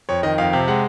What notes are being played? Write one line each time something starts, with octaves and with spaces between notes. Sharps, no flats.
F2 C#5
D#3 D#5
F2 F5
C3
G#3 F#5